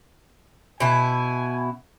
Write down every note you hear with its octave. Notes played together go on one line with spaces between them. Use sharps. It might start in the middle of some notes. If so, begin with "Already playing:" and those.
B2 E4 G#5